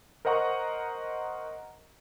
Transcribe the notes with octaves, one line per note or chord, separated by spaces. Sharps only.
A#4 C5 D#5 F#5 A#5 C#6